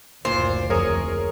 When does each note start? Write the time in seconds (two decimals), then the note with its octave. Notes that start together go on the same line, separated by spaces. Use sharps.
0.25 F#1 D2 A#2 C5
0.70 F2 G#4 A#4 C#5 D#6